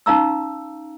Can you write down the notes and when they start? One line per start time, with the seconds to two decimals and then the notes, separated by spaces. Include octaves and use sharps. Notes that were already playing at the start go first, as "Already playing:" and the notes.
0.06 C#4 D#4 F5 A#5 E6